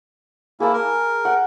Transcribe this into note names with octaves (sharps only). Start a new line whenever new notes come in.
A#3 E4 G#4 A5
A#4
F#5 G5